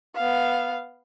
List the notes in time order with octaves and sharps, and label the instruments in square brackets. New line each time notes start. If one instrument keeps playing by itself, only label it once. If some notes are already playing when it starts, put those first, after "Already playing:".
[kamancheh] B3 F5